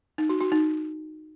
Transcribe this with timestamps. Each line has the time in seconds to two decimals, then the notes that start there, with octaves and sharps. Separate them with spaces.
0.18 D#4
0.29 F#4
0.41 F#4
0.52 D#4